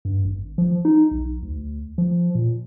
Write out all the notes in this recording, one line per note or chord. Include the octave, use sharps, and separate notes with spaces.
G2
G#1
F3
D#4
B1
D2
F3
A#2